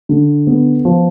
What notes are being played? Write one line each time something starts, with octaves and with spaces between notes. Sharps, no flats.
D3
B3
F3